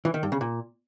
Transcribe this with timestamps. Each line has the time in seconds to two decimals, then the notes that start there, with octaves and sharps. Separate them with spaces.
0.05 E3
0.14 D#3
0.23 G2
0.32 C#3
0.41 A#2